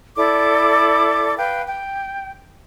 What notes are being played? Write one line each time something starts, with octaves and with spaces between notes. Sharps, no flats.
E4 A4 D5 D6
B4 F5 G5
G5